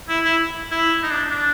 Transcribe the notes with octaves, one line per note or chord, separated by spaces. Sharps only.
E4
E4
E4
D#4
D4
D4